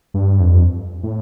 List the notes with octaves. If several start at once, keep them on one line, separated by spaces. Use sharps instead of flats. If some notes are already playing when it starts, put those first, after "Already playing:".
G2
F2
A2